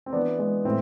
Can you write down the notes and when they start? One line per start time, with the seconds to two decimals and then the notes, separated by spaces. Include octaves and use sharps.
0.06 C4
0.13 E3 B3 D4
0.39 G#3
0.65 A2 C4